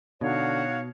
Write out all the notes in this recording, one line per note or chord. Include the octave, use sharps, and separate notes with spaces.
B2 D3 D#4 F#4 C#5 F5